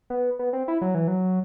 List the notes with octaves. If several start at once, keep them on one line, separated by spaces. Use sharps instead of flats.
B3
B3
C4
E4
F#3
E3
F#3